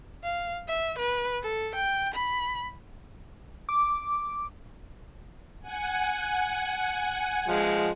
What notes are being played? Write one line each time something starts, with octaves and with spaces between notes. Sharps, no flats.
F5
E5
B4
A4
G5
B5
D6
F#5 G#5
F3 G#3